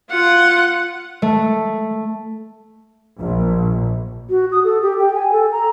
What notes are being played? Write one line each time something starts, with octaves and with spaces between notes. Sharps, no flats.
F4 F#5
A3
A#1
F#4
D#6
A4
G4
G5
G#5
A4
A#5